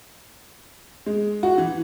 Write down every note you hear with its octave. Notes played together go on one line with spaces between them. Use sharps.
G#3
F#4
E3